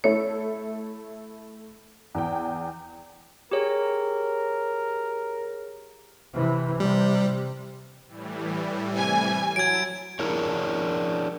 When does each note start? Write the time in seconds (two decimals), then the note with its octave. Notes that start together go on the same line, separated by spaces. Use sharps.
0.04 A3 E4 A4 C#5
2.15 E2 G5
3.52 G4 G#4 A#4 C#5
6.34 C3 E3
6.80 C3 G3
8.07 A2 E3 G3
8.96 C3 G#5
9.56 F#3 E4 A5 G#6 D7
10.19 D4 E4 G#4 A#4 C#5